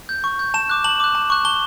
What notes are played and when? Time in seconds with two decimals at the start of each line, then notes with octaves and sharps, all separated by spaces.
0.09 G6
0.24 C#6
0.39 G6
0.54 A5 E7
0.70 D6 F#6
0.84 A5 F#7
1.00 D6 F#6
1.15 A5
1.30 C#6 F#6
1.45 A5 G7